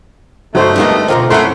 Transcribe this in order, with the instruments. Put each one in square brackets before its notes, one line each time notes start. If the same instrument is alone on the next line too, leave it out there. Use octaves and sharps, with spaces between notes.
[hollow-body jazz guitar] G2 D3 F#3 [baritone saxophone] A3 [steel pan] D#4 F#4 C5
[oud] F3 G#3 A#3 [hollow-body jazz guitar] G3 B3 [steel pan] D4 D#4
[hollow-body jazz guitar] D2 F4 A#4 [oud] B2 D3 C4
[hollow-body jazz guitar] C2 F#2 A#4 [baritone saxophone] A3 [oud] C#4 E4 [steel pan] F#5 C6